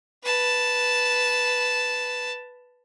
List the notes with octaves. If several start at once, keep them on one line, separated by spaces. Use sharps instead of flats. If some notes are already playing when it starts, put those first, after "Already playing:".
B4 A5